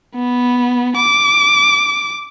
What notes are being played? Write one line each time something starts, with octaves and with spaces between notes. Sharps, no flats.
B3
D6